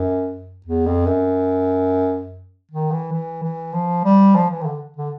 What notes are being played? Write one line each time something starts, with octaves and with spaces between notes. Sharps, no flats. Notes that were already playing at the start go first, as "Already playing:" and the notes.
Already playing: F#2
E2
F2
F#2
D#3
E3
E3
E3
F3
G3
F3
E3
D#3
D3
D3